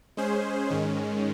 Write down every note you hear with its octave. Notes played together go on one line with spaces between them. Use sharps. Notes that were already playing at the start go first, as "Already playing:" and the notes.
G#3 C#4 G#4 C5
G#2 D#3 G#3 C#4